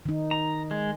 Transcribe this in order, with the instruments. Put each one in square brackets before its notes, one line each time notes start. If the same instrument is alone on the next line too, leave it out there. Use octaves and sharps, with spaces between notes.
[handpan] D#3 D#4
[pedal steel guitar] A#5
G#3